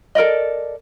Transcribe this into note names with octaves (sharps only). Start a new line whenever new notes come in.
A4 A#4 D5 D#5